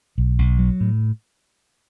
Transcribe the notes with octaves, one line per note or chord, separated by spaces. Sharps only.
B1
B1
F#3
A2